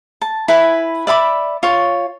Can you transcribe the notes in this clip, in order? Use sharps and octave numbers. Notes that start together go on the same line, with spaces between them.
A5
E4 B4 G#5
D5 E5 B5 D6
F4 C#5